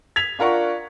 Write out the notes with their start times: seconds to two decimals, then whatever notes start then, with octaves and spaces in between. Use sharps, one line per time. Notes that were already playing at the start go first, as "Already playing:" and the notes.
0.16 G#6 B6 F7
0.39 D4 F4 A#4 F#5 C#6